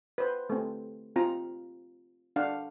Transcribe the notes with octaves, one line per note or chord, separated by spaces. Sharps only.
B4 C5
A3 C4
C4 F4 A#5
D4 F5 F#5